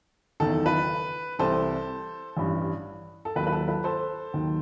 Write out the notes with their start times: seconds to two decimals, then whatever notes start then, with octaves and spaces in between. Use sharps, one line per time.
0.40 F#1 E2 D#3 A4
0.66 B4
1.39 C2 C3 E3 G3 A4 C5
2.37 A1 G2 E3
3.25 A4
3.36 D#2 D#3 F#3 B4
3.47 B4
3.52 A4
3.68 B4
3.84 A4 C5
4.34 D#2 D#3 F#3